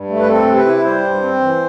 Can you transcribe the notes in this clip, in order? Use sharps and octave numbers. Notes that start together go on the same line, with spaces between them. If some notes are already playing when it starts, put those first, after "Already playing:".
Already playing: G2
A3
B4
C4 A4
C3
B4
E4
G3 C5
G2
C4
E3